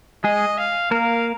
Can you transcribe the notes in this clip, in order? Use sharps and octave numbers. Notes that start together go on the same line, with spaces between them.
G#3 G#4 D#5
F5
A#3 A#4 F5